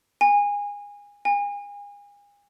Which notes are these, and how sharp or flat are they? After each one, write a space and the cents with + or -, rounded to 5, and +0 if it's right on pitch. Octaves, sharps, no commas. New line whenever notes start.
G#5 -25
G#5 -35